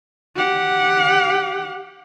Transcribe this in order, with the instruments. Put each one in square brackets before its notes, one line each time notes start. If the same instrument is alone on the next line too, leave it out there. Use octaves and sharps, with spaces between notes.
[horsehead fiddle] G4 F#5